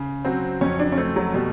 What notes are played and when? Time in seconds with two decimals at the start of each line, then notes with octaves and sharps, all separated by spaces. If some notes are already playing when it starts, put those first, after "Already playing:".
Already playing: C#3
0.25 F#3 C4
0.61 F2 C#4
0.79 D4
0.92 C#4
0.97 A3 C4
1.16 F#3
1.34 B2 G3